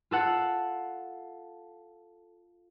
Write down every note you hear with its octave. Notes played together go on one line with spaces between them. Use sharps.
F4 A4 F#5